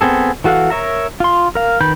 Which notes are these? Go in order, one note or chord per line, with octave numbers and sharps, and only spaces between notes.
B3 C4 G#4 A4
E3 F#4 A4 F5 F#5
A#4 C#5 E5 A#5
F4 C6
A#4 F5
D#3 B4 B5 G6